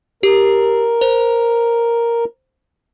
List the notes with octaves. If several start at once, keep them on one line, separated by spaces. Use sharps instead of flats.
G4 A#4
C5